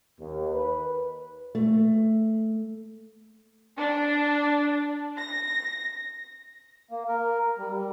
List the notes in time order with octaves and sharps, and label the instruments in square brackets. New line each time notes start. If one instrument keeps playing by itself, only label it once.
[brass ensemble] D#2
B4
[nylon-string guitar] A3
[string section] D4
A#6
[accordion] A#3
A#4
G3
G3